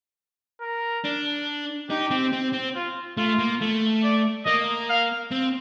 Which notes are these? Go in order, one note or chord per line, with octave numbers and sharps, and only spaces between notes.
A#4
D4
D#4 G4
C4
C4
C4
F4
A3 F4
A#3
A3
D5
A#3 D#5
F5
C4